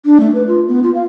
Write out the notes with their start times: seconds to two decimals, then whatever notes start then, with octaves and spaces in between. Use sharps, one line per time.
0.05 D4
0.20 A3
0.35 B4
0.47 F4
0.68 B3
0.83 F4
0.95 F5